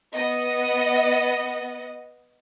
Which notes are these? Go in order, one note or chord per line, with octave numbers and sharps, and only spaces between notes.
B3 D#5 F#5